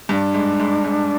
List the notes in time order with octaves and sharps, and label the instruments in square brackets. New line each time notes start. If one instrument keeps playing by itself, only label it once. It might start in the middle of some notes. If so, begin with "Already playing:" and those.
[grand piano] G2 [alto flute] D4
[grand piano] G#2
G#2
G#2